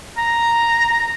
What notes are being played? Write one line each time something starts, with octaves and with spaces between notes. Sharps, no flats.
A#5